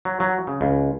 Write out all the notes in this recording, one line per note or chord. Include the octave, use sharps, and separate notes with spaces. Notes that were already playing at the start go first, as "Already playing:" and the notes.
F#3
F#3
C#3
C#2